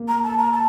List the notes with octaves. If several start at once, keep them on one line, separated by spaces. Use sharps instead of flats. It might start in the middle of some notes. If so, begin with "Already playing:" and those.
Already playing: A#3
A#5
A5
A#5
A5